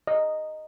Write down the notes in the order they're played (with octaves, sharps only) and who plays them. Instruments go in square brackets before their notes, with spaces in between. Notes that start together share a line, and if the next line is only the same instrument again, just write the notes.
[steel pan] D#5